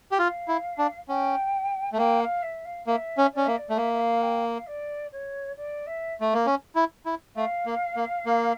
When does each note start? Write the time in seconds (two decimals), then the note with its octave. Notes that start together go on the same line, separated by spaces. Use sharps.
0.11 G4
0.18 F4 F5
0.48 E4
0.78 D4
1.08 C#4 G5
1.93 A3
1.98 A#3 G5
2.20 F5
2.42 E5
2.65 F5
2.87 A#3 E5
3.18 C#4
3.32 C#4 D5
3.45 A#3 E5
3.57 D5
3.70 A3
3.77 A#3 E5
3.93 E5
3.99 F5
4.22 G5
4.44 F5
4.67 D5
5.12 C#5
5.56 D5
5.86 E5
6.21 A3
6.33 A#3
6.46 C#4
6.75 E4
7.06 E4
7.36 A3 F5
7.66 A#3
7.96 A#3
8.26 A#3